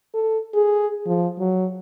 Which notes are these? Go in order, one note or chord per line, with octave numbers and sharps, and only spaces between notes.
A4
G#4
F3
F#3